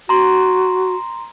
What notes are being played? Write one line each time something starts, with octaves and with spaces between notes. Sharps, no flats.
F#4 A#5 C6